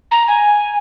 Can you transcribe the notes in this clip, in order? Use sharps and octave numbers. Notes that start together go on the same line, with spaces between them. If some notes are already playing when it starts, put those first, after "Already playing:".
A#5
G#5